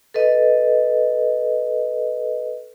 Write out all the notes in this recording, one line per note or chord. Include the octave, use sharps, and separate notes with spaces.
A4 B4 D#5